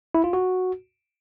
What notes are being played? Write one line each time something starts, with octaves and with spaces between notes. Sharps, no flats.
E4
F4
F#4